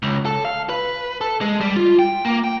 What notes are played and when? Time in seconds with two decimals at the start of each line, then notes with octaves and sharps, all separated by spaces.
0.03 C#2
0.25 A4
0.45 F5
0.69 B4
1.21 A4
1.41 G#3
1.61 G3
1.76 F4
1.99 G5
2.25 A#3
2.44 G5